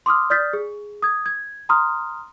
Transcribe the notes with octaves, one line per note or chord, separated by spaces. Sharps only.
C6 D6 D#6 F6
D5 D#6 F6 G6 A6 B6
G#4
D#6 G#6
G#6
A#5 C6 D#6 F6